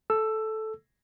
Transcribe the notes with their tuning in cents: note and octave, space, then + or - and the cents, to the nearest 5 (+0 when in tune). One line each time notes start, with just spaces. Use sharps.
A4 -10 E6 +10